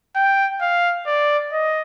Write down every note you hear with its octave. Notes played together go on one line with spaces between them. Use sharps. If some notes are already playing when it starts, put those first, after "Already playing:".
G5
F5
D5
D#5